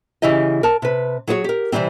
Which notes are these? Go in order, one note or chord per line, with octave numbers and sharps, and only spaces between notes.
C#3 E3 E4 G4 D#5
A#4 A5
C3 B4
F#3 F#4 G#4 C5 C#5
G4 A#4
C3 D#3 E3 G3 C4